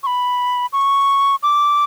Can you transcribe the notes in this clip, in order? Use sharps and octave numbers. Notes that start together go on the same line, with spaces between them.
C#6
B5
C#6
D6